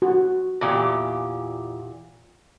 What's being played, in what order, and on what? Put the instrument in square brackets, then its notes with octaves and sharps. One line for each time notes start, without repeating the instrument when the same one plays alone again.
[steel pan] F#4
[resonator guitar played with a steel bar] E2 A#2 G4